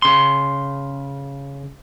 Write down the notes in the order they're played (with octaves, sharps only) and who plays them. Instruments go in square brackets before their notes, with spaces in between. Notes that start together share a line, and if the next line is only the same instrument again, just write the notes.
[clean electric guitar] C#3 C6